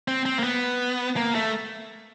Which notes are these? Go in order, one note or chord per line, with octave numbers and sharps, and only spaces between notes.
C4
C4
A#3
B3
A#3
A3